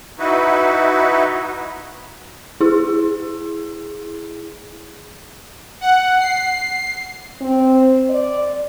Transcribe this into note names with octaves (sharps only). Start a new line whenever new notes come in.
D#4 E4 F#4 B4
E4 G#4
F#5
C7
C4
D5